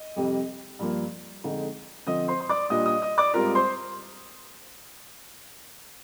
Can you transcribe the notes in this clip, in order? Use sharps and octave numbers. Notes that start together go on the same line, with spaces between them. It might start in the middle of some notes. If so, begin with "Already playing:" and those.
Already playing: D#5
F2 C3 G3
G2 F3 A#3
F2 D3 G#3 D#4
D3 F3 C4 D#5 D#6
C5 C6
C6
D5 D6
A#2 G3 D4 F4 D#5 D#6
D#5 D#6
D#5 D#6
D5 D6
G#2 G3 C4 F4 A#4 A#5
C5 C6